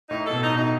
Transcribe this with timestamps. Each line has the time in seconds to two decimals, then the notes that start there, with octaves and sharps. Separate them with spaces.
0.10 A2 D#4
0.26 B2 A4
0.42 D#4
0.52 B2 D#4